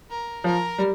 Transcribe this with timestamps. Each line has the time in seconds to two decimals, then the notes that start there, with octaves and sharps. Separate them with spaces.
0.10 A#4
0.44 F3 A#4
0.78 G3